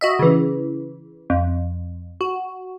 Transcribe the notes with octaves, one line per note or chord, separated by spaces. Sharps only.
F#4 D#5 E5
C#3 E3
F2
F#4